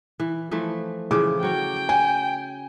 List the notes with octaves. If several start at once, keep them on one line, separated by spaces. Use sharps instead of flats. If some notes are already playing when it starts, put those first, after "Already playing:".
E3
E3 F3 A3
C#3 E3 F3 D6
F#3 C#5 G5
G#5